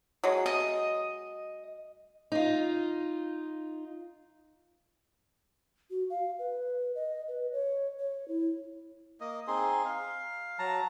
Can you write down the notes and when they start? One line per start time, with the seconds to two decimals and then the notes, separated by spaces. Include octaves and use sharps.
0.24 F#3 G#3
0.46 D#5
2.32 D#4 F4
5.91 F#4
6.10 F5
6.39 B4
6.95 D#5
7.28 B4
7.52 C#5
7.99 C#5
8.28 E4
9.21 A#3 D#5
9.47 C4 D#4 G#4 C6
9.85 F5
10.59 F#3 A5 A#5